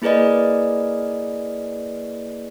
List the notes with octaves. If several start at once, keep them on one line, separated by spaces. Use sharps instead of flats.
A#3 E4 G#4 B4 D5 D#5